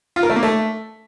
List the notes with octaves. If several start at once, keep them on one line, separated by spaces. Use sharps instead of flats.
F4
A#4
A3
A#3
A3